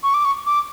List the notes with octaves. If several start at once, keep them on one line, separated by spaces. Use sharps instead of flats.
C#6
D6
C#6
D6